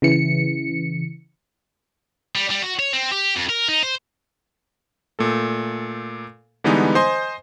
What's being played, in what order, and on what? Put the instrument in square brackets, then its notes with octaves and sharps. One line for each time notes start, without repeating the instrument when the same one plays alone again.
[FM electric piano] C#3 E3 C#7
[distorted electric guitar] G3
G3
F#4
C#5
C4
G4
F2
A#4
D#4
C5
[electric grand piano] A#2 A3 A4
D3 E3 G3 G#3 B3 D#4
C5 D#5 G#5 C6